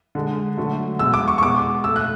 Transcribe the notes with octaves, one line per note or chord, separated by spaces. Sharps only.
D3 G#3
D3 F#3 A3
B2 G#3 E6
D6
C#6
C#6
B2 G#3 D6
B2 A3 E6
F#6